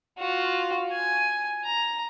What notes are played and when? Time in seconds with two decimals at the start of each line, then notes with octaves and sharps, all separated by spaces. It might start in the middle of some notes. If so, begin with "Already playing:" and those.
0.18 F4 F#4
0.92 G#5
1.64 A#5